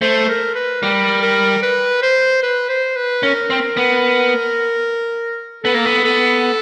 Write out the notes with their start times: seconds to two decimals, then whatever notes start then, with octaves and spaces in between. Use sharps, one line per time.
0.01 A3 C5
0.29 A#4
0.55 B4
0.82 G3 A#4
1.22 A#4
1.63 B4
2.03 C5
2.43 B4
2.69 C5
2.96 B4
3.23 C#4 A#4
3.50 C4
3.77 B3
5.64 B3 A4
5.74 A#3
5.85 B3
6.05 A4